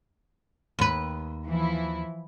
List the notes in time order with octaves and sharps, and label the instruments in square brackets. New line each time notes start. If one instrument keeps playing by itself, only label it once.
[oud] D#2 B4
[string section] E3 F3 E4